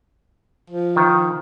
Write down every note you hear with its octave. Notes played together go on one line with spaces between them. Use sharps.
F3
D#3